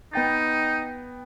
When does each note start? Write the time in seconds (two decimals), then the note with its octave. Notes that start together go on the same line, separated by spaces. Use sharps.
0.13 B3 D#4 G5 A6